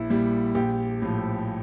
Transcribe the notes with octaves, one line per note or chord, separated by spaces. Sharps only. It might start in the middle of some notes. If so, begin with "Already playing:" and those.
Already playing: A#1 E4
A#2 G3
A#1 G4
A2 F3